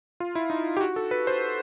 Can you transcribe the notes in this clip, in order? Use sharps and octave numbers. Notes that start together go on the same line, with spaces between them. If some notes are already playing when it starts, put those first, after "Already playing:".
F4
E4
D#4
G4
F#4
A4
B4
C5